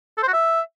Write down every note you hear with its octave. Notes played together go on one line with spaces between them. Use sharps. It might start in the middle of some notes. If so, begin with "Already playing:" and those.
A4
C5
F#4
E5